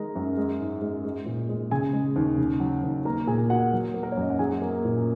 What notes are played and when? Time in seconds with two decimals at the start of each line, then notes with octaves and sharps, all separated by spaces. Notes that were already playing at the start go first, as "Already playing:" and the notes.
Already playing: D#3 G#3 A#4 A#5
0.16 F#2
0.37 G#3
0.60 G#2
0.82 G#3
1.05 G#3
1.26 A#2
1.49 G#3
1.71 C#3 G#4 G#5
1.93 G#3
2.16 D#2
2.38 C#3
2.60 F#3
2.84 D#2
3.05 A#3 A#4 A#5
3.27 A#2 G#4 G#5
3.50 A#3 F#4 F#5
3.73 F#3
3.94 A#3
4.03 A#4
4.12 C#5
4.17 F#2 D#5
4.30 F#5
4.39 F#3 G#4 G#5
4.62 A#3
4.85 A#2